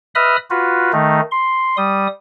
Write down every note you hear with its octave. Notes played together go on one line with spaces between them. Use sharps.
B4 D#5 E5 B5 D#6 F6
F4 F#4 B4
D#3 A3 D#4
C6
G3 D#6